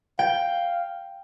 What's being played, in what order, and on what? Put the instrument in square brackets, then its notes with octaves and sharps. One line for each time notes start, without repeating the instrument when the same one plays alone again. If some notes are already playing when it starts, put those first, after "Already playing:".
[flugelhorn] F5 [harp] G5